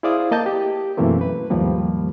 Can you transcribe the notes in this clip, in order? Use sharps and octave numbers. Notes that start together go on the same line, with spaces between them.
E4 G#4 C5 D5 F5 D#6
A#3 D#5 A5 G6
G4
F#2 B2 E3 A3 A#3 C4
B4
D#2 G#2 D#3 F3 G3 A#3